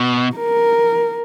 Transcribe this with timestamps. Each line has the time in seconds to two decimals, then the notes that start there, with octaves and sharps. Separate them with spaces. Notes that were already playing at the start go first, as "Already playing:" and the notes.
Already playing: B2
0.36 A#4